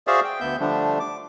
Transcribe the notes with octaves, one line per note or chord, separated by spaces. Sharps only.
F#4 G#4 C5 D5 E5 F5
G5
D2 B3 E5 G6
D3 F3 G3 A3 D4
D6